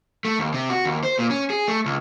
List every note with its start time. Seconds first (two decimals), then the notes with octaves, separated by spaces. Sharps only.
0.25 A3
0.39 D#2
0.53 C3
0.70 F#4
0.85 D#2
1.03 C5
1.19 A#2
1.31 C#4
1.50 G#4
1.68 A3
1.86 C#2